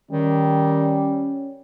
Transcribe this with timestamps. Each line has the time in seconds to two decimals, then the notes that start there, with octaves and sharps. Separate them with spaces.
0.11 D#3 G3 C#4